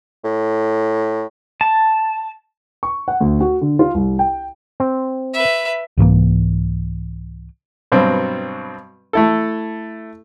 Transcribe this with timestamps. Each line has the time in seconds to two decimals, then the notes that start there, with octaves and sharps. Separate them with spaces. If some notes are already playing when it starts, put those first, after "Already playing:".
0.25 A2
1.61 A5
2.83 C#6
3.08 F#5
3.21 D2
3.41 F#4
3.61 D3
3.79 F4
3.94 C2
4.19 G5
4.80 C4
5.33 B4 E5
5.97 C2 G#2 E3 A#3
7.92 G2 B2 F#3 C4
9.13 A3 E4 A4